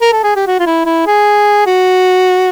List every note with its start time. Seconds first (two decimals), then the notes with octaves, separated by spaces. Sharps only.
0.01 A#4
0.13 A4
0.24 G#4
0.36 G4
0.47 F#4
0.60 F4
0.66 E4
0.86 E4
1.06 G#4
1.66 F#4